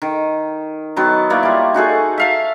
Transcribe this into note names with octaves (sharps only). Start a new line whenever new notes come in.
D#3
D#3 F#3 B3 A5
A#3 E4 C#5 D5
G3 F4
D#4 F#4 G#4 A4
E5 F5 A5